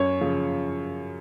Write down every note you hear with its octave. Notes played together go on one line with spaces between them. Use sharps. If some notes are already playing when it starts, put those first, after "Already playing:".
Already playing: F#2 C#5
C#3 F3